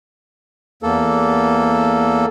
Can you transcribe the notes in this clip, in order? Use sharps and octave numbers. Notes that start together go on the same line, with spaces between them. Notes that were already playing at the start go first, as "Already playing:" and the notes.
E2 A#3 A4